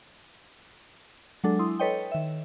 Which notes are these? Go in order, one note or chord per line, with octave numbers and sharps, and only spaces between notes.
F#3 G#3 D4 A4
E4 C6 D#6
A4 B4 C#5 D#5 G5
D#3 E5